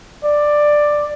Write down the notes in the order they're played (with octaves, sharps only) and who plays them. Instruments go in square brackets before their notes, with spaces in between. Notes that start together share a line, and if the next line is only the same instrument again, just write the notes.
[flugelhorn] D5